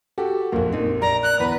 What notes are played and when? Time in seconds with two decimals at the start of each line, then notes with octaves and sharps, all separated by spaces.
0.18 F#4 G4 A4
0.52 A#1 F2 A#3
0.72 C4 D#4
1.02 D5 A#5
1.23 F#6
1.40 E2 B4